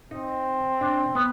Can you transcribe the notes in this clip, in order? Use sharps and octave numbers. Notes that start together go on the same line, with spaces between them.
C4 D#4
D4
B3